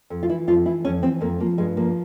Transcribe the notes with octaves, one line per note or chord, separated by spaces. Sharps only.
F2
F4
E3 E4
F2 F4
E3 E4
F2 C#4
E3 C4
F2 A#3
F3 A#3
G2 G#3
F3 A#3